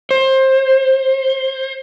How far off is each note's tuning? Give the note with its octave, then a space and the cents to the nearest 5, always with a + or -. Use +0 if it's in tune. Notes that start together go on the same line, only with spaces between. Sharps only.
C5 +25